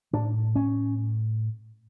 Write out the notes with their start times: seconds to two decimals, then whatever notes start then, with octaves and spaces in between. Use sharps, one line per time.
0.13 A2 D4
0.56 C#4